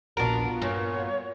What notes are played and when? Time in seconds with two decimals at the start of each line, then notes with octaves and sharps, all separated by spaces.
0.17 D#1 A#1 B3 D4 F4 F#4 A#4
0.62 G2 A#2 C#5